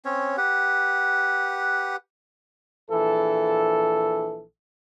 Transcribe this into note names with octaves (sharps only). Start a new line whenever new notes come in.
C4 C#4 C#5
G4 B4 F#5
A#1 E3 A4